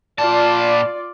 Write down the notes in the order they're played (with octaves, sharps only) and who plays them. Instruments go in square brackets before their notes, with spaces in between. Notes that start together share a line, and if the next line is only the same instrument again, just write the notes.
[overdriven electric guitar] A#2 A5 [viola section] F4 D5